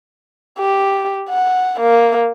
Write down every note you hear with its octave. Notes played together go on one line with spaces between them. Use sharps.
G4
F#5
A#3